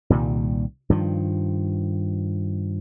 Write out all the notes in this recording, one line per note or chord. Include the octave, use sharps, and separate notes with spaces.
C2 A#2 D#3 G3
G2 D#3 F3